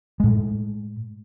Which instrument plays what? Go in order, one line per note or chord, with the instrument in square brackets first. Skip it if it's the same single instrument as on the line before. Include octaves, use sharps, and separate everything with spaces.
[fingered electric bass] A2 G#3